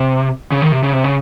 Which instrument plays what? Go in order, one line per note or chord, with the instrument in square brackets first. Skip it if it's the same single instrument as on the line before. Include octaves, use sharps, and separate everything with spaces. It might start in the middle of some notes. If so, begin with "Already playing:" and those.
Already playing: [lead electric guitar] C3
C#3
D#3
C3
C#3
C3
C#3